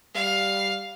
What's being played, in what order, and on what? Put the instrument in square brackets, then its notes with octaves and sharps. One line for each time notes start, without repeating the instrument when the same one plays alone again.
[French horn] G3 [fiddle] F5